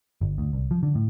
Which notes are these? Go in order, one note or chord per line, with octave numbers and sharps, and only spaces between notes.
G1
D2
C2
F3
D3
A2